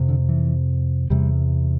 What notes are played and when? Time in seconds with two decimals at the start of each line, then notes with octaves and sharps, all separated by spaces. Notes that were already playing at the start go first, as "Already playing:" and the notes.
Already playing: F2 C3
0.09 D3
0.29 E3
1.10 E2 C3 G3